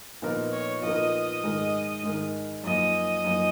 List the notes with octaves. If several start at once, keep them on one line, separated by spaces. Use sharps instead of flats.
A#2 F3 B3 D#4 A#4
C#5
A#2 F3 B3 D#4 A#4 D#5
G#2 D#3 G#3 D#4 A#4
G#2 D#3 G#3 D#4 A#4
F#2 F3 A#3 D#4 D#5
F#2 F3 A#3 D#4